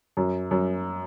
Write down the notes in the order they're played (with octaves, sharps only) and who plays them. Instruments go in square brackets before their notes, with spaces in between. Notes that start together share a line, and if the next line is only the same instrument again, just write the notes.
[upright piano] F#2
F#2